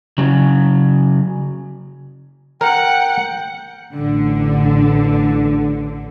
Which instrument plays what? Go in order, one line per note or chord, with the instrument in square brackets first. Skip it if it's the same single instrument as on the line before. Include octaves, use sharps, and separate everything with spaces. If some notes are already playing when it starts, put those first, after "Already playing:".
[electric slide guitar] C#3 F#3
[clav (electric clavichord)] A#4 [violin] F#5 [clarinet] G5
[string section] A1 D3